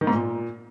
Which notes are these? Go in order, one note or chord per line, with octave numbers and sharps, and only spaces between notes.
D#3
G#2
A#2